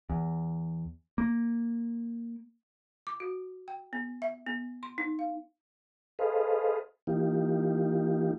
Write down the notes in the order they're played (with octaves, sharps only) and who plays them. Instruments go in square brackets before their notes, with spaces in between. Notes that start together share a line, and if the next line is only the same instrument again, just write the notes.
[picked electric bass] E2
A#3
[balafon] D6
F#4
G5
B3
E5
B3
C6
D#4
F5
[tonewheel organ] G#4 A4 B4 C5 D#5 F5
E3 A#3 D#4 F4 G4